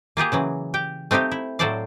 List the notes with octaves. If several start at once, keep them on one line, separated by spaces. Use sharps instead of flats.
A#3 F4 G4 G#4
C#3 E3 F#3
G4 G5
A3 C4 D#4 G4 F5
E4
A2 F#3 A4 C5 D5 F5